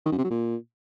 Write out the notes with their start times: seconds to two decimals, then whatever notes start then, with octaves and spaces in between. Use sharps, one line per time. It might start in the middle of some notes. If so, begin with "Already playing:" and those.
0.06 D#3
0.12 F#2
0.18 C3
0.24 F#3
0.31 A#2